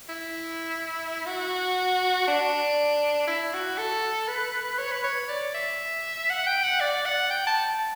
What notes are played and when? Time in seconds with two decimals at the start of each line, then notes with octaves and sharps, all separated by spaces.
0.09 E4
1.26 F#4
2.28 D4
3.28 E4
3.53 F#4
3.78 A4
4.28 B4
4.78 C#5
4.91 B4
5.03 C#5
5.29 D5
5.54 E5
6.30 F#5
6.46 G5
6.63 F#5
6.80 D5
7.05 F#5
7.30 G5
7.47 A5